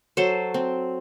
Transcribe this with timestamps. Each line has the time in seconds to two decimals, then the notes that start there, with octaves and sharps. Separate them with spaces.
0.17 F#3 A4 C5
0.54 C4